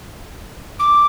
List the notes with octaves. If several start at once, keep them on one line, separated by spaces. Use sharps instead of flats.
D6